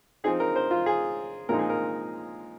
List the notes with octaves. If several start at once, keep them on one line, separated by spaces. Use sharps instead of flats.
F3 C4 D#4 G#4
A#4
C5
F4
G#4
A#2 F3 G#3 C4 D#4 A#4
G#4
A#4